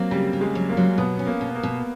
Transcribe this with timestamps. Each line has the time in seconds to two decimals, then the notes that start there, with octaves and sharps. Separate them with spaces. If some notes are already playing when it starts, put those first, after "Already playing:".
Already playing: F#3 A#3 C4
0.11 C#3 G3
0.33 C#3
0.41 G#3
0.55 F#3
0.69 A#3
0.77 F#3
0.98 B2 B3
1.19 C#4
1.26 A#3
1.41 B2
1.55 A#3
1.63 B2